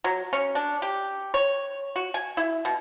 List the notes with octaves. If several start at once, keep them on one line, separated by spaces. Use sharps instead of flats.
F#3
C#4
D4
G4
C#5
F#4
G#5
E4
B2